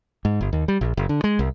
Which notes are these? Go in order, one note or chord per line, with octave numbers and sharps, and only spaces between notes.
G#2
G1
D#2
G3
A#1
F#1
D3
G#3
C2